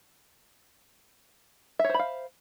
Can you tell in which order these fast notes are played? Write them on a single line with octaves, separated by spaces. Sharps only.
E5 C#5 C5 B5 F5